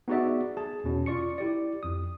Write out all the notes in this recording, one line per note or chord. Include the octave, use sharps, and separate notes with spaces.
B3 D#4 F#4 G#4 D5 E5
G#4 A5
E2 B2 C#4
F4 D5 C#6 C#7
E4 G4 D5
F2 D#6